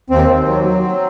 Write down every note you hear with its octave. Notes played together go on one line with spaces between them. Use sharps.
D#2 C4
D#2
F#3
F#3
F#3